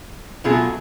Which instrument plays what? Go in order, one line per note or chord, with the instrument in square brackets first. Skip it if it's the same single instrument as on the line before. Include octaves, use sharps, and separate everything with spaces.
[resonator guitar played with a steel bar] B2 F#3 A3 F4 G#4